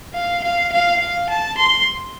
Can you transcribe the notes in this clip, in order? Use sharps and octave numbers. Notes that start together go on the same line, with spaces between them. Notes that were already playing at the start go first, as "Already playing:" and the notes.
F5
F5
F5
F5
A5
C6